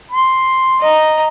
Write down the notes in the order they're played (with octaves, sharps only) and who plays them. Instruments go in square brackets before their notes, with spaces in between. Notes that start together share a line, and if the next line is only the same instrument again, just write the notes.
[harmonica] C6
[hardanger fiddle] D#5 A#5